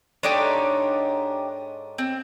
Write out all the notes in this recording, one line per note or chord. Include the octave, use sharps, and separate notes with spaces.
G#2 D4 D#4 G4 A4 C#5
C4